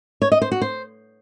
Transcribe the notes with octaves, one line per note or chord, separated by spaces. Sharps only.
C#5
D#5
C5
F#4
C5